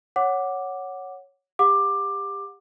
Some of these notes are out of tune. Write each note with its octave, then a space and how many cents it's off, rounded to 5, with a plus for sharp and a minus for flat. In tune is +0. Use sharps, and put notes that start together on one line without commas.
C#5 +0 F#5 +0 D6 +0
G4 +30 F#5 -30 D6 +15